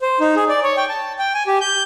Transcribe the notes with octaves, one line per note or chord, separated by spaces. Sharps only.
C5
D#4
G#4
D5
C#5
G5
A5
G5
G#5
G4
G6